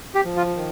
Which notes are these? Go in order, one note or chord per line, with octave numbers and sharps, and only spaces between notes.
G4
F3
F4
D#3